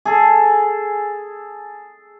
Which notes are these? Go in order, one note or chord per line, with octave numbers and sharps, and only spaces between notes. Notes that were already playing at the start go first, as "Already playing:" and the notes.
G#4 A4